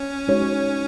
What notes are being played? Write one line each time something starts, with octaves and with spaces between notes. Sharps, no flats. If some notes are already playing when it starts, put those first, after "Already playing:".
Already playing: C#4
G#3 D#4 F#4 C#5